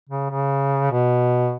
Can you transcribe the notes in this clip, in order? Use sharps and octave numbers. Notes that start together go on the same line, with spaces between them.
C#3
C#3
B2